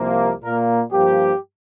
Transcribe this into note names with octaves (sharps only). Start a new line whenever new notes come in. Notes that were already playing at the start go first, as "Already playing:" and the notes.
Already playing: C2 C3 F3 A#3
A#2 A#3 A#4
G2 F3 A#3 G4